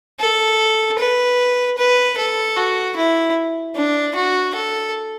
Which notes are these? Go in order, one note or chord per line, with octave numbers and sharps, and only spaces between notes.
A4
B4
B4
A4
F#4
E4
D4
F#4
A4